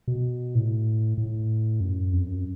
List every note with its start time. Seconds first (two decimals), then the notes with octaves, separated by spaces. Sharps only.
0.08 B2
0.55 A2
1.18 A2
1.80 F#2
2.13 F2
2.28 F#2